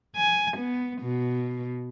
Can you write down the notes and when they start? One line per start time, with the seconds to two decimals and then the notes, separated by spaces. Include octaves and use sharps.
0.17 G#5
0.56 B3
1.02 B2